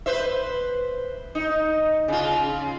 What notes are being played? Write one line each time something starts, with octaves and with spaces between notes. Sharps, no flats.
B4 C5 E5
D#4
C#3 F4